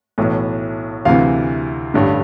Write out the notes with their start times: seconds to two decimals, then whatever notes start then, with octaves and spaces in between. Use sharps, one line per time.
0.18 B1 A2 E3
1.05 D2 C3 E3 F5
1.94 A1 G2 D3